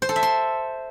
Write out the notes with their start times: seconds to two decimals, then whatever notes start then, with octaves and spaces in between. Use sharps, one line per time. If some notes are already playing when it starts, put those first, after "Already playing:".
0.02 C5
0.09 A4
0.16 E5
0.23 C6